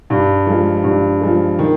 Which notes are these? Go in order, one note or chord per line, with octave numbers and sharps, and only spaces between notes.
G2
F3 G#3
G2
F3 G#3
D#3